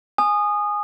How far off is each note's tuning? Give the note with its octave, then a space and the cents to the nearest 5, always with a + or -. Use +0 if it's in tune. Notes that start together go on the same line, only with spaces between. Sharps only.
G#5 +0 D#6 -20